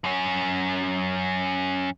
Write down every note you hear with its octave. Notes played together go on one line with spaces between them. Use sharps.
F#2 C#4